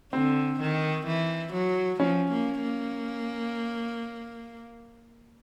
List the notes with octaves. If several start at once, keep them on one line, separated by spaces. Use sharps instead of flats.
D3 C4
D#3
E3
F#3
F3 C#4
A#3
A#3